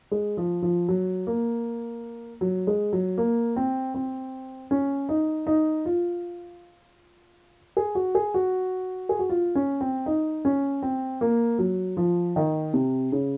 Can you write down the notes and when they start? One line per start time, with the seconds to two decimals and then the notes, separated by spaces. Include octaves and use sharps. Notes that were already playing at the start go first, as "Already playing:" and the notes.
0.11 G#3
0.37 F3
0.62 F3
0.88 F#3
1.27 A#3
2.41 F#3
2.67 G#3
2.93 F#3
3.18 A#3
3.56 C4
3.94 C4
4.71 C#4
5.09 D#4
5.47 D#4
5.85 F4
7.77 G#4
7.95 F#4
8.15 G#4
8.34 F#4
9.09 G#4
9.19 F#4
9.30 F4
9.55 C#4
9.81 C4
10.06 D#4
10.45 C#4
10.82 C4
11.21 A#3
11.59 F#3
11.97 F3
12.36 D#3
12.74 C3
13.12 C#3